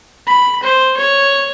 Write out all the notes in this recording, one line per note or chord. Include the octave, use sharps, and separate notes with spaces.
B5
C5
C#5